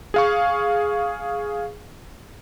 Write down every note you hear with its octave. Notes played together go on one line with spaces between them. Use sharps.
G#4 F5 C#6